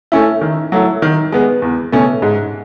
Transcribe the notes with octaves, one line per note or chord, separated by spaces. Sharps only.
A3 C#4 E4
D#3
F#3 A3 E4
D#3
G#3 B3
E2
B2 A3 C#4
G#2